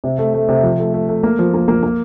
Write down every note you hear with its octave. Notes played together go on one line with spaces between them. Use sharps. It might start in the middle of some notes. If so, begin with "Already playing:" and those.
C3
A3
A3
C3
F3
A3
A3
A3
A#3
F3
A#3
A#3
A#3